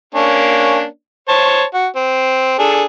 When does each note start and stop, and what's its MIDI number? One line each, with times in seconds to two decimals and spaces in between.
0.15 0.85 58
0.15 0.85 61
0.15 0.85 62
1.28 1.63 72
1.28 1.63 73
1.28 1.63 81
1.74 1.87 66
1.96 2.57 60
2.59 2.84 62
2.59 2.84 68
2.59 2.84 69